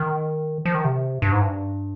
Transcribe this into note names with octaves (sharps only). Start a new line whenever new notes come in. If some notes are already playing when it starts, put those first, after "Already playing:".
Already playing: D#3
F3
D#3
C3
G2
G#2
G2